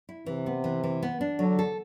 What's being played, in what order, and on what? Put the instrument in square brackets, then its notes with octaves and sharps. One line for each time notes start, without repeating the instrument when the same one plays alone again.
[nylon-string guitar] E4
[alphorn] C3 [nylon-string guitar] E3
[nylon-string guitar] B3
E3
E3
B3
D4
[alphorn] D3 [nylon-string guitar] F#3
[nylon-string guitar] A4